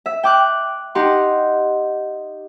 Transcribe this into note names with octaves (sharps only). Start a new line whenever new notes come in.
E5
G5 D6 F#6
D#4 G4 F#5 C6